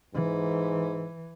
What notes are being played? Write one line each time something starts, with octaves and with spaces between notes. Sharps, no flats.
G#2 E3